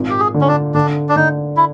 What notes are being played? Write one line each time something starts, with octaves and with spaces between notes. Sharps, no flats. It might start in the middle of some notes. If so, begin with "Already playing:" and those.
Already playing: G#1 A#2
G4
G#4
D3
C#4
D4
D3 D4
D4
D3 D#4
E4